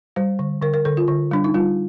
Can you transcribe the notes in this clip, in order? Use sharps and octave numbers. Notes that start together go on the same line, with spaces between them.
G3 C5
D3
D3 A#4
A#4
D3 A4
F4
D3
G3 D4
D#4
G3 F4